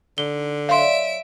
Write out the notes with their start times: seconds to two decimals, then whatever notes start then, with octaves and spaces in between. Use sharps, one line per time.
0.18 D3 D#4 G7
0.69 F#3 C#5 D5 E5 F5 C6 D7